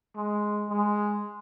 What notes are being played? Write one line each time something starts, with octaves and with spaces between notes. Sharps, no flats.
G#3
G#3